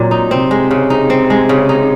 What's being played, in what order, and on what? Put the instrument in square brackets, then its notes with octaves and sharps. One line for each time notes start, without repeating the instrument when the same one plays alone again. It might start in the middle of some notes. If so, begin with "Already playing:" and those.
Already playing: [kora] A#2 F#3 C4
D#4
[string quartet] C3 [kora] C4
[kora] G#3
C#3
D#4
C4
G#3
C#3
D#4